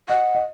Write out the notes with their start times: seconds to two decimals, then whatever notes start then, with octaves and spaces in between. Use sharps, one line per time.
0.09 D#5 F#5
0.35 D#5